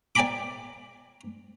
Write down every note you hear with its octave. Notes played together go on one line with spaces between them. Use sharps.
D5 G5 G#5 A#5 B5 D6